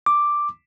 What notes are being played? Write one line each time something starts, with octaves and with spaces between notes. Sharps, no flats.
D6